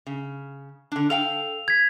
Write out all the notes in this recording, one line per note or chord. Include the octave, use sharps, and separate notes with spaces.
C#3
D3 D4
A4 F5 G5 F7
G#6 B6